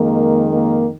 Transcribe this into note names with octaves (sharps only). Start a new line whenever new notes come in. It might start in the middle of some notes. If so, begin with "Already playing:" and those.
Already playing: F2 D#3 G#3 A#3
A#3